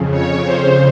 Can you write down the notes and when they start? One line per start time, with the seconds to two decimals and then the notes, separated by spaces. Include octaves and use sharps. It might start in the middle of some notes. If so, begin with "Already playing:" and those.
Already playing: F2 C#3
0.11 C#5
0.44 C5